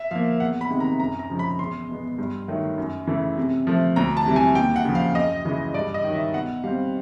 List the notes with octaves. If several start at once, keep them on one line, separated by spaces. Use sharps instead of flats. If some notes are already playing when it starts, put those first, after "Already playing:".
Already playing: E5
F3 A#3 F5
E2 F#5
B5
C3 D#3 G#3
A#5
F#2 A#5
A#5
C#3 F3 G#3
B5
E2 C6
B2 G#3 B3
G2
D#3 F#3 A3
F#2
C#3 E3 A3
C3
F3 A3
D2 A#5
A5
C3 E3 G3
G#5
D#2 G5
F#5
C#3 F3
F5
F#2 D#5
C#3 E3 G#3
G2 D5
D#5
D#3 F#3
E5
B2 F#5
G3 C4 F5